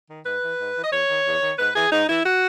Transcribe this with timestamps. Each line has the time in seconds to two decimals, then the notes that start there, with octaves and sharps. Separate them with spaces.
0.09 D#3
0.25 G#2 B4
0.43 E3
0.59 G#2
0.76 E3
0.84 D#5
0.92 E2 C#5
1.09 D#3
1.26 E2
1.42 D#3
1.59 G#2 B4
1.75 E3 G#4
1.92 G#2 D#4
2.09 E3 E4
2.26 F#4